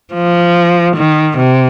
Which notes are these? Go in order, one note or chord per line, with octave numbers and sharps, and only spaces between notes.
F3
D#3
C3